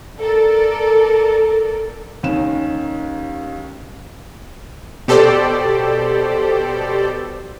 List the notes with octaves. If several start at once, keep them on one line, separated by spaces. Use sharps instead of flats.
A4 A#4 D5
D#2 D#3 C#4 E7
B2 G4 A4 C5 D5